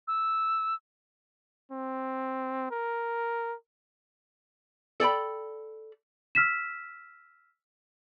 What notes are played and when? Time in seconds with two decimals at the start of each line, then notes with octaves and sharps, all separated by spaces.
0.08 E6
1.72 C4
2.71 A#4
5.00 A4 D5 G5 B5
6.35 E6 F6 B6 E7